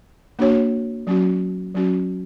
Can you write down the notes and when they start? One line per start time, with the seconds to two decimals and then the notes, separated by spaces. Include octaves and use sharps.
0.39 A#3 D4 F#4 C#5
1.07 F#3 C#4 F#4
1.75 F#3 C#4 F#4